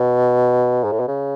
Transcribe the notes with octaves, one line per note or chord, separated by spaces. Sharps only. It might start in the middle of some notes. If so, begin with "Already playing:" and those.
Already playing: B2
G#2
A2
B2
C#3